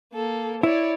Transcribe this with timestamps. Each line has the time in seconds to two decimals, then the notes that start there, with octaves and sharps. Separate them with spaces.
0.14 A#3 A4
0.63 E4 C#5 D5